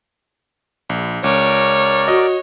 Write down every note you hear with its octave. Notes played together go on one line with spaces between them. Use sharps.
A#1
C#2 A#4 C#5 D5 D6
F#4 D#5